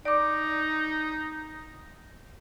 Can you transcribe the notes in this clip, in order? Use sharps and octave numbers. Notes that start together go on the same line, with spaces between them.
D#4 D5 D6